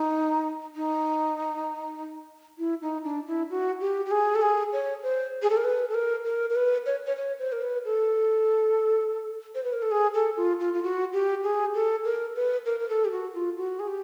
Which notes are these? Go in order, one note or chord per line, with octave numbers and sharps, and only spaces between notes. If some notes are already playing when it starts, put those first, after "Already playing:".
Already playing: D#4
D#4
E4
D#4
D4
E4
F#4
G4
G4
G#4
A4
G#4
C#5
C5
G#4
A4
A#4
B4
A4
A#4
A#4
A#4
B4
C#5
C#5
C#5
C5
A#4
B4
A4
C5
B4
A#4
A4
G#4
A4
F4
F4
F4
F#4
G4
G#4
A4
A#4
B4
A#4
A#4
A4
G4
F#4
F4
F#4
G#4
G4